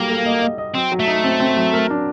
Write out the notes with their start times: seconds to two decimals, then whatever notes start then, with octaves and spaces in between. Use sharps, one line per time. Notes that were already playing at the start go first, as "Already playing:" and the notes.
Already playing: F#3 G3 A#3 A4
0.10 A4
0.26 D#5
0.42 D#5
0.58 D#5
0.75 F#3 C4
0.92 F#3
1.00 A3
1.07 D#4
1.24 C4
1.40 C4
1.57 F#3
1.73 A#4
1.90 D4